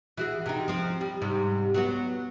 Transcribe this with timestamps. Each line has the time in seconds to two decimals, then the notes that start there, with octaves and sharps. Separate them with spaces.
0.17 E3 F#4 G#4
0.46 C3 D#4
0.68 F3 C4
1.01 G3
1.22 G#2 C3 G3
1.74 F#3 B3 F#4